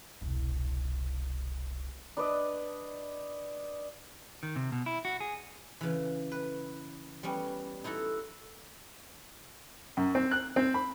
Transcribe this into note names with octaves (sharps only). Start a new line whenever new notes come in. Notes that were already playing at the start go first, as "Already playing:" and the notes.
E1 C2
D4 B4 D5 D#5
D#3
C3
B2
E4
F#4
G#4
C#3 E3
B4
G3 B3 C#4
D#4 E4 F#4 A4
F#2
C4
F#6
C4
B5